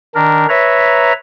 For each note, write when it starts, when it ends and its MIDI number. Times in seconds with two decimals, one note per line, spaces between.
0.15 0.46 51
0.15 0.46 62
0.15 0.46 70
0.49 1.12 71
0.49 1.12 73
0.49 1.12 76
0.49 1.12 82